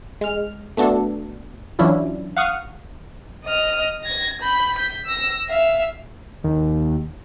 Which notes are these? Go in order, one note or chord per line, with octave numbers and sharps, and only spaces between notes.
G#3 F6
A3 B3 D4 F#4 A4
E3 F#3 C#4 D4 E4 F4
F5 F#5 C#6 D#6 F6
D#5 F6
G#6 A#6
B5 G6
G6 B6
E6 A#6
E5 F5
D#2